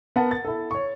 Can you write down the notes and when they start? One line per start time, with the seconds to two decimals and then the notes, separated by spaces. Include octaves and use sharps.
0.16 B3 A#4 F#5 A5
0.31 A6
0.45 E4 A4
0.71 C#5 C#6